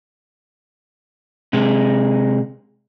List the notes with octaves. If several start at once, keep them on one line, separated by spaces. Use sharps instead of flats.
C3 G#3